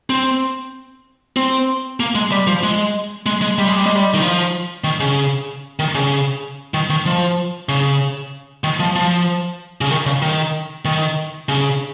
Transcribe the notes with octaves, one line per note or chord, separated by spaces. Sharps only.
C4
C4
A#3
G#3
G3
F3
G#3
G#3
G#3
G3
G#3
G3
G#3
G3
D#3
F3
D#3
C#3
D#3
C#3
D#3
D#3
F3
C#3
D#3
F3
F3
C#3
D#3
C#3
D#3
D#3
C#3